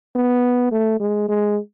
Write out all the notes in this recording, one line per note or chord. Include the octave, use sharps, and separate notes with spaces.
B3
A3
G#3
G#3